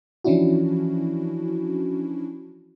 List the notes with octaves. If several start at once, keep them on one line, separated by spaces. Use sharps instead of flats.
E3 F3 C#4 D4 E4 F#4